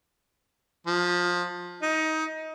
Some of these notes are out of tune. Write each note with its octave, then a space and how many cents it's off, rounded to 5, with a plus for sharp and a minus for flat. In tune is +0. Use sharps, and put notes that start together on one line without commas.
F3 +20
D#4 +20